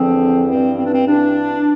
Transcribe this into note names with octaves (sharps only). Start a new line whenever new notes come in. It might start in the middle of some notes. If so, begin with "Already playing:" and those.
Already playing: E2 D3 F3 C4
G2 E3 C4
C4
D4
C4
G2 E3 D4